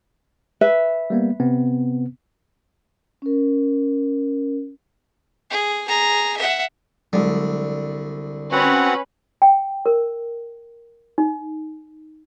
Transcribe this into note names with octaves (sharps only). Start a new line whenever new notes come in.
B4 E5
G3 A#3 B3
C3 B3 C4
C#4 A#4
G#4
G#4 A#5
E5 F#5
C2 D3 F#3 G#3
C4 C#4 F#4 B4 F#5
G5
A#4
D#4